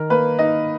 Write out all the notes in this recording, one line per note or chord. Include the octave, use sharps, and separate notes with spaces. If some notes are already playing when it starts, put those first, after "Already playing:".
Already playing: D#3 A#4
A#3 B4
D#4 D#5